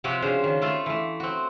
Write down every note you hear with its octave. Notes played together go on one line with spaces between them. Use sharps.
C3 F3 C4 F#4 G4
C#3 D4 C5
D#3
A3 F4 A4 C6
E3 A3
C4 F#4